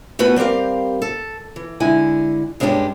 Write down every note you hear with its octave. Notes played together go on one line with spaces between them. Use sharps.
A2 A3 B3 F#4 B4 G#5
G3 C4 G4 A#4 F5
A4
E3
D3 G#3 E4 G#5
G2 G#3 B3 C#4 D4 G4